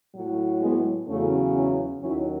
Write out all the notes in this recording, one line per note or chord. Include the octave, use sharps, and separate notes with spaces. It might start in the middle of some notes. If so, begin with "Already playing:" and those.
A2 F#3
G#3 B3
E2 C#3 F#3 A3 C#4
C#4 E4
D#2 D#3 F#3 C#4 E4